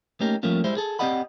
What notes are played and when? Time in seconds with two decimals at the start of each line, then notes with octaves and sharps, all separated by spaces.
0.20 A3 A#3 C#4 D#4 G4 A#4
0.43 F3 G3 A3 A#3 C#4 F4
0.64 G3 G#3 E4 C5
0.77 G#4 A4
0.99 C4 G4 D5 D#5 F#5 B5